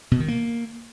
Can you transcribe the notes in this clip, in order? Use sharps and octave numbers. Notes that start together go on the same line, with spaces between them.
B2
D#3
A#3